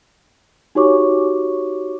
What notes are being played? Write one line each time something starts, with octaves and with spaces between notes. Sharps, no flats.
D#4 F#4 G4 C#5 C#6 D6